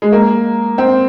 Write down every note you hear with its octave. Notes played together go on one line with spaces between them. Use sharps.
G#3
A#3
C4